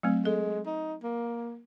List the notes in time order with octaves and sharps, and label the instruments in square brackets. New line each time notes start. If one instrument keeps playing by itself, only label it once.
[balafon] F#3 A3 C4
[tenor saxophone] G#3 [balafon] A4
[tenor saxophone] D#4
A#3